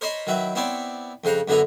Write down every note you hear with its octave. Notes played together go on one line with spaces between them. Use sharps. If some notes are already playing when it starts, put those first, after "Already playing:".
A#4 C5 C#5 D#5 B5 C6
D#3 F#3 E4 B4
B3 C4 E4 C#5 D5
F2 C#3 C5 F#5 A#5
F#2 D3 B3 E4 G#4 A#5